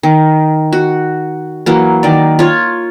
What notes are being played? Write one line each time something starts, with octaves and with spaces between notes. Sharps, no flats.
D#3
F#4
E3 F#3 A#3
D#3 D5
F4 C#5